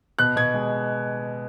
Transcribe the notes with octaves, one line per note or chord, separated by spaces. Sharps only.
B2 F#6
B2 G#6
G#3